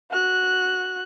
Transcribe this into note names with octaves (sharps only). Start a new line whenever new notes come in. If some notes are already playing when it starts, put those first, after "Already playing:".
F#4 F#6